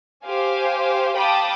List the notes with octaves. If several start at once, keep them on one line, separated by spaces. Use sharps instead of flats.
G4 C5 F5 G#5
F5 G5 A5 B5 D6 D#6